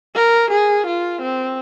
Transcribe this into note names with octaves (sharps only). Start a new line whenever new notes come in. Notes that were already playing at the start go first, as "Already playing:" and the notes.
A#4
G#4
F4
C4